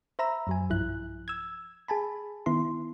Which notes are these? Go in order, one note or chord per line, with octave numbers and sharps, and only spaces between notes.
C5 E5 A#5 B5 E6
F#2 F#3 G#5
B1 G2 F3 E4 F#6
E6 G#6
G#4 G#5 A5 B5
D#3 B3 E4 C6